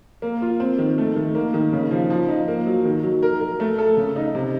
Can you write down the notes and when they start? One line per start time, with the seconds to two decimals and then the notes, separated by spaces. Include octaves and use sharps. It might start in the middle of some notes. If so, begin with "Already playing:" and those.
0.22 A#3
0.42 F4
0.60 C4
0.78 D#3
0.98 A3
1.16 D#3
1.35 A#3
1.54 D#3
1.73 C#3
1.91 F3
2.10 F3
2.29 D#4
2.48 A#3
2.66 F#3
2.85 D#3
3.03 F#3
3.23 A#4
3.40 A#4
3.60 A3
3.78 A4
3.97 C#3
4.16 D#4
4.35 C3